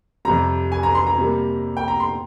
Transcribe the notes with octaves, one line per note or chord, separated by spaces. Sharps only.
F2 C3 G3 A#5
G#5
A#5
C6
A#5
C3 G3 A#3
G5
A#5
C6